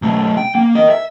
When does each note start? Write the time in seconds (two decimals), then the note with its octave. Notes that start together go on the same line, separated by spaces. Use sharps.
0.02 B1 A3
0.37 G5
0.55 A#3
0.75 A#4 D#5
0.90 E5